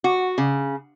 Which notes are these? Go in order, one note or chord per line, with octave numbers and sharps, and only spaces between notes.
F#4
C#3